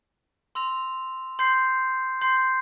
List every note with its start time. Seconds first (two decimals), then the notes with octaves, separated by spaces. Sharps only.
0.55 C6 E6 A#6 F7
1.39 C6 G6 C7
2.22 C6 G6 C7